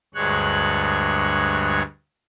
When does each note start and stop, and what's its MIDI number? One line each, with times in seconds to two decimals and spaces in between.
0.15 1.82 38
0.15 1.82 43
0.15 1.82 56
0.15 1.82 73
0.15 1.82 90